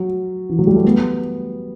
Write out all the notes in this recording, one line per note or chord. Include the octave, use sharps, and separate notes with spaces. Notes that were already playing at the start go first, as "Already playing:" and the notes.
Already playing: F#3
E3
F#3
G3
A3
B3